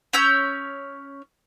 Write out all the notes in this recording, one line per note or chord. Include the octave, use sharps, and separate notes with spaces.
C#4 C#5 E6 G6